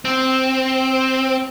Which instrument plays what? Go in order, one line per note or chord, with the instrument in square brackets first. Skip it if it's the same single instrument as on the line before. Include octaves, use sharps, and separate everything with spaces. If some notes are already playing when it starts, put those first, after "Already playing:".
[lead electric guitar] C4